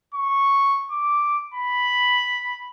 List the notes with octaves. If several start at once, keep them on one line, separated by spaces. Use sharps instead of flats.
C#6
D6
B5